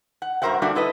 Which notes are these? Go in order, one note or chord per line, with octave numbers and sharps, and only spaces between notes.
F#5
G2 F#4 A#4 C5 E5 F#5
G3 A3 A#3 D4 F#4 E5
E4 A4 B4 D#5